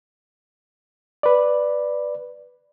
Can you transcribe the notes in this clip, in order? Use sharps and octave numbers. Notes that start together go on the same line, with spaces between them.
B4 D5